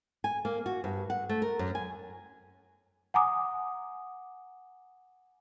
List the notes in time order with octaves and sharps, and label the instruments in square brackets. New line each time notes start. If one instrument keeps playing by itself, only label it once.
[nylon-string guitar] G#5
A#3
F#4
G2
F#5
A3
A#4
F#2
G#5
[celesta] F#5 G#5 A#5 D6 D#6